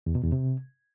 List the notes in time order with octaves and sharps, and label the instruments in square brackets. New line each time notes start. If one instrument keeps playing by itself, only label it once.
[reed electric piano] E2
B2
E2
C3